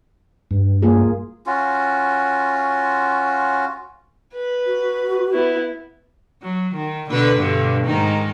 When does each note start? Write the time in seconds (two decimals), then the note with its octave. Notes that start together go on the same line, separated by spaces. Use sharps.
0.51 G2
0.82 A#3 F4 G#4
1.47 C#4 F4 F#4
4.34 B4
4.66 F#4
5.33 B3 E4
6.42 F#3
6.75 D#3
7.09 B2 D3 B4
7.39 G2 B2 D3
7.85 G#2 D#3 D#4